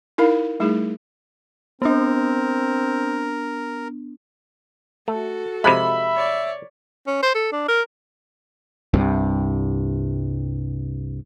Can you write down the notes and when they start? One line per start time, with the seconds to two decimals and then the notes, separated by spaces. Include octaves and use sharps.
0.18 D#4 E4 A#4 F5
0.60 G3 A3 D#4 E4 G#4
1.82 B3 C4 D4 A#4
5.08 A3 F#4 A4
5.64 C3 F3 G#3 E5 B5
6.15 C#5 D5
7.07 C#4
7.23 C5
7.35 A4
7.52 D4
7.68 A#4
8.94 C2 G2 C3